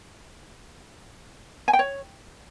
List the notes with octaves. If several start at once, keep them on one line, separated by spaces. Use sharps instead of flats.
G#5
G5
C#5